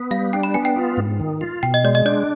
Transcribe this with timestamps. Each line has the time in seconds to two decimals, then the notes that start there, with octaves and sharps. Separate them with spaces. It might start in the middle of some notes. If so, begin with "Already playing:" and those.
Already playing: B3
0.11 G3 F5
0.33 D4 G5
0.43 B5
0.54 B3 G#5
0.65 G5
0.76 F4
0.97 G#2
1.20 D#3
1.41 F4
1.63 B2 G5
1.74 D#5
1.84 G#3 D5
1.95 D#5
2.05 D4 D5